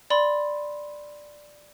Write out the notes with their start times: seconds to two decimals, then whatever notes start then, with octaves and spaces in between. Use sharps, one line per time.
0.10 D5 B5 C6